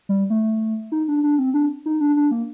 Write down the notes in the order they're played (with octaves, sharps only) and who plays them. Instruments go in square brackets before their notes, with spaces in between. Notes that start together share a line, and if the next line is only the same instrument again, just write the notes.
[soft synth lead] G3
A3
D#4
D4
D4
C4
D4
D#4
D4
D4
A#3